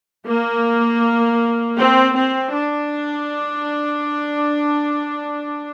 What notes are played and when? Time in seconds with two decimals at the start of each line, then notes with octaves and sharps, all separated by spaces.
0.24 A#3
1.77 C4
2.15 C4
2.53 D4